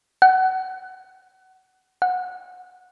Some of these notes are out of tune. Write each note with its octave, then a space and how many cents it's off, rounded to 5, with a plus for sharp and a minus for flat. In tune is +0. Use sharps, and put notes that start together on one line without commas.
F#5 +20
F#5 -20